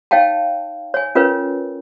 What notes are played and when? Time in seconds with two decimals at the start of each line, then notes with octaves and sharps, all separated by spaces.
0.11 D#4 C#5 F5 G5 A5
0.94 C#5 G#5
1.15 C#4 F4 A#4 B4 C#5